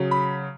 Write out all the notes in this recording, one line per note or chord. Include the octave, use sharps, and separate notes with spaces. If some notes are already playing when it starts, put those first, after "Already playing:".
Already playing: C#3 F#3
B5